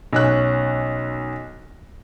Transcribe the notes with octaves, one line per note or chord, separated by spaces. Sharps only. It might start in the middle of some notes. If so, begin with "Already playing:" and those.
B1 C#4 F#6